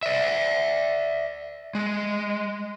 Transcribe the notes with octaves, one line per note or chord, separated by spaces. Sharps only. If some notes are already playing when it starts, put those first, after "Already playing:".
D5 E5
G#3